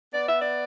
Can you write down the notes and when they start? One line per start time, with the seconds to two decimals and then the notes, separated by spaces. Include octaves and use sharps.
0.14 B3 D5
0.28 E5
0.41 D5